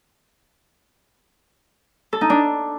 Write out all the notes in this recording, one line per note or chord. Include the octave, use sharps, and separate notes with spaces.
A4
D#4
D4